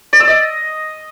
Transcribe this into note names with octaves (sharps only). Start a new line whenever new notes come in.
D5
E6
D#5